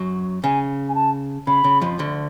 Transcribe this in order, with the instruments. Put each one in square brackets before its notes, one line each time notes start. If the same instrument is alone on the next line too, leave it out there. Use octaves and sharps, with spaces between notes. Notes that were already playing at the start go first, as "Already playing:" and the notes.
Already playing: [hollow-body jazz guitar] F#2 F#3
[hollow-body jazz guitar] C#3 [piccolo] G#5
[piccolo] G#5
A5
[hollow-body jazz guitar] C#3 [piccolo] B5
[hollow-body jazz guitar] C#3
F2 F3
D2 D3